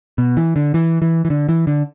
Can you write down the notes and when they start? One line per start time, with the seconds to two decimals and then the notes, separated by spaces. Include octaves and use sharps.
0.18 B2
0.37 E3
0.56 D3
0.74 E3
1.02 E3
1.25 E3
1.30 D3
1.49 E3
1.67 D3